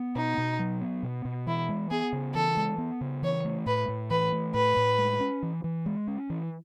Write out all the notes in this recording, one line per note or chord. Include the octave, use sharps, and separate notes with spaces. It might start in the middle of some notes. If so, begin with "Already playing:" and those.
Already playing: B3
B2 D#4
B2
F#3
B3
B2
B2
E3 E4
G#3
B3 G#4
C#3
E3 A4
G#3
B3
C#3
E3 C#5
A3
A2 B4
A2
E3 B4
A3
A2 B4
A2
G#3
C#4
E3
E3
G#3
C#4
E3